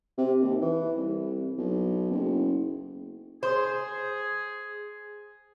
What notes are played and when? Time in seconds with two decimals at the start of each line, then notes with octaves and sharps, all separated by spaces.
0.18 C3
0.42 D#2
0.61 E3
0.97 C2
1.58 B1
2.10 F#1
3.43 G#4 C5